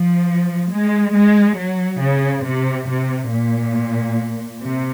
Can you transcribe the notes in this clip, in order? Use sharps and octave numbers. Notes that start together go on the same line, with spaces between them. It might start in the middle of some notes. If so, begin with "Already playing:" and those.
Already playing: F3
G#3
G#3
F#3
C#3
C3
C3
A#2
C3